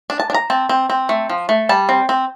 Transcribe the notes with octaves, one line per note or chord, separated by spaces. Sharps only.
D4
A5
D4
A#5
C4 A5
C4
C4
A3
F3
A3
G3 A5
C4
C4